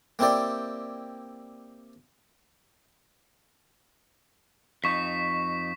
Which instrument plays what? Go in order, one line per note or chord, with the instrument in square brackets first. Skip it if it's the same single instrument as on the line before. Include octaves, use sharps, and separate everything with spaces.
[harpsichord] A#3 C4 E4 G4 D5
[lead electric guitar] F2 D#4 [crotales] C#6 B6